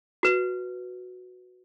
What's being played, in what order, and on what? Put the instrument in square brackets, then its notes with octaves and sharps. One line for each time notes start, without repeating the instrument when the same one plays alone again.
[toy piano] F#4 B4